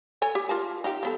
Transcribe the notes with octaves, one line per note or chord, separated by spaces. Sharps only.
A4 C#5 G#5
G4
F4 A#4 A5
D#4 F4 G4
F3 B3 A4